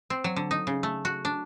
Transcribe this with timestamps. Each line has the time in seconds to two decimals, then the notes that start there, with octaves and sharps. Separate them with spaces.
0.10 C4
0.24 F#3
0.36 D3
0.51 D#4
0.67 C#3
0.83 A3
1.05 F#4
1.25 D4